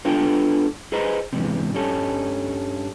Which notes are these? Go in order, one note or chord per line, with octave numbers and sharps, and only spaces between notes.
B3 D4 F4 A4 G5
G#4 B4 C5 D#5 A#5
E2 G#2 C3
G2 G3 C#4 A4